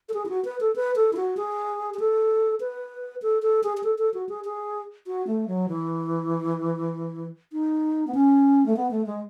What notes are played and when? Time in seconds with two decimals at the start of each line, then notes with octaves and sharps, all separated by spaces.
0.09 A4
0.14 G#4
0.26 E4
0.29 F#4
0.45 B4
0.61 A4
0.76 B4
0.96 A4
1.13 E4
1.17 F#4
1.37 G#4
1.94 G#4
1.99 A4
2.60 B4
3.22 A4
3.42 A4
3.63 G#4
3.77 G#4
3.84 A4
3.99 A4
4.14 F#4
4.29 G#4
4.44 G#4
5.07 F#4
5.27 A3
5.48 F#3
5.68 E3
7.53 D#4
8.07 B3
8.14 C#4
8.66 A3
8.77 B3
8.91 A3
9.06 G#3